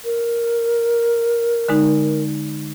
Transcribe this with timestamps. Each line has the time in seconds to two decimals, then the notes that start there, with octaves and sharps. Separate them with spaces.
0.05 A#4
1.68 D3 G#3 D#4